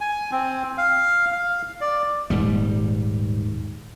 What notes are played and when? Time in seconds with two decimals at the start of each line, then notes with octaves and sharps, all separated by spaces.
0.01 G#5
0.32 C4
0.78 F5
1.32 F5
1.81 D5
2.30 D#1 G#2 G3